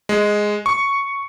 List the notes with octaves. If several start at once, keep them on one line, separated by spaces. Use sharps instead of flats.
G#3
C#6